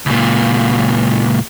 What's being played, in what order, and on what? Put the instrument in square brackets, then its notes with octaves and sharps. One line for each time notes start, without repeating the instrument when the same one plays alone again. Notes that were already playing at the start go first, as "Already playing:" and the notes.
[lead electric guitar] C#2 A#2